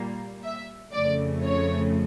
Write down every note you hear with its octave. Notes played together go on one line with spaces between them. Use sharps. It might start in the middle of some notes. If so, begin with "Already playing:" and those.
Already playing: A#2 G3 A#3
E5
F2 C#3 F3 A3 D5
C#5